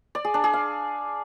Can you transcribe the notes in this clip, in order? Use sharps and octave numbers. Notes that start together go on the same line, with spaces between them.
D5
G#4
D4
G#4
F5